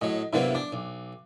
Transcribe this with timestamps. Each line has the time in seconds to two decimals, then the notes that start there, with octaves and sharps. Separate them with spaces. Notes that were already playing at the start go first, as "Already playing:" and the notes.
0.01 A2 F#3 D#5
0.33 C3 F#3 A#3 B3 D4 E4
0.55 D4 D6
0.72 B1